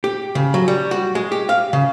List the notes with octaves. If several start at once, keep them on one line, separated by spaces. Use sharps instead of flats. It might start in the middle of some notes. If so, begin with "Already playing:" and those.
G4
C#3
F#3
G3
F#4
G#3
G4
F5
C#3